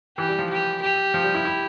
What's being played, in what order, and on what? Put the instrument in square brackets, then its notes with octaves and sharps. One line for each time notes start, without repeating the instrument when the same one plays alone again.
[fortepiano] E3 [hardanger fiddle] G4
[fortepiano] G3
F3
[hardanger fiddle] G4
G4
[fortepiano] F3
G3
E4
E4